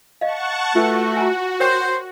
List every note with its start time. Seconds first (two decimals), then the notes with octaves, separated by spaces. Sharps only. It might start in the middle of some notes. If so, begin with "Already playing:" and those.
0.21 D#5 F5 F#5 A5 C#6
0.75 A3 F4 F#4 B4 A5
1.17 G#5 A#5
1.60 A#4 C5 C#5 G5